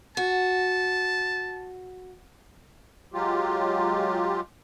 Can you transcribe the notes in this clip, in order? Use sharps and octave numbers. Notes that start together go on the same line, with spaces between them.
F#4 A5
F#3 G#3 F4 G4